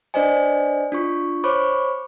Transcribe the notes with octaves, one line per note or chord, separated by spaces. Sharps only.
D4 B4 C5 D5 D#5 G#5
D4 F4 C#6
C5 C#5 B5 C#6 D6